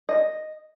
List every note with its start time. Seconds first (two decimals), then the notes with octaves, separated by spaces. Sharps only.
0.09 D#5